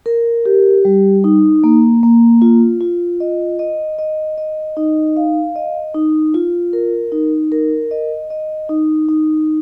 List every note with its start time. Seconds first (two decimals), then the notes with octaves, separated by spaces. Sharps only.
0.06 A#4
0.46 G4
0.85 G3
1.24 D#4
1.64 A#3
2.03 A#3
2.42 F4
2.81 F4
3.20 D#5
3.59 D#5
3.99 D#5
4.38 D#5
4.77 D#4
5.17 F5
5.56 D#5
5.94 D#4
6.34 F4
6.73 A#4
7.12 D#4
7.52 A#4
7.91 D#5
8.30 D#5
8.69 D#4
9.09 D#4